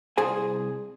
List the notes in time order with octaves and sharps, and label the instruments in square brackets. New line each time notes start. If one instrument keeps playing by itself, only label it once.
[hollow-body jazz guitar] C2 G#4 C5 G#5